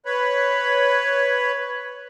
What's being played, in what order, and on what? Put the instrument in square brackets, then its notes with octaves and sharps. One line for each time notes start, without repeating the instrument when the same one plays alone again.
[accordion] B4 C#5 B5